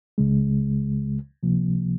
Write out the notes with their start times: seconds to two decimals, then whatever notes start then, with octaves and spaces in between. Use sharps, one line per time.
0.18 C#2 C#3 G#3
1.43 C#2 C3 F3 A#3